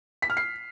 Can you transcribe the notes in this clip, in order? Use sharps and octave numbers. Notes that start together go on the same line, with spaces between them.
B6
F6
C7